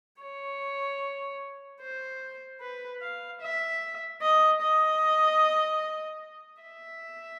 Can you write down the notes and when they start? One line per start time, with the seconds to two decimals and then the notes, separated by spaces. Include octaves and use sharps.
0.22 C#5
1.82 C5
2.61 B4
3.02 F5
3.42 E5
4.22 D#5
4.62 D#5
6.62 E5